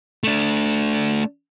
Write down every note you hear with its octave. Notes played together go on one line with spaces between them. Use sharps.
A3 D4